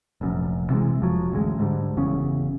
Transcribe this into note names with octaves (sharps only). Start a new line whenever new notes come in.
F1 A#1 F#2
C3 E3 F#3 G#3
F1 F3 F#3
A1 D2 G#3
G#2 D3 G3
F#1 E2 C#3 C#4